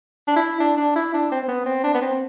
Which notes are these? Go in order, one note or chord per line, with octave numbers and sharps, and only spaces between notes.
D4
E4
D4
D4
E4
D4
C4
C4
B3
C4
D4
B3
C4